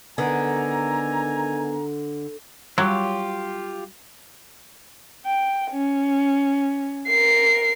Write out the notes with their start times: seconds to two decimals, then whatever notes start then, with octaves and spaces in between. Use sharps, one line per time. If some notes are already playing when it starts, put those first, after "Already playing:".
0.18 D3 D#3 B3 G#5 A#5
2.78 F#3 G3 F4 G4
5.26 G5
5.72 C#4
7.07 A#4 C7